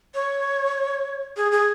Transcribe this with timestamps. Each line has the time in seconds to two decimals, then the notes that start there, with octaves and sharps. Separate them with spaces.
0.14 C#5
1.37 G#4
1.52 G#4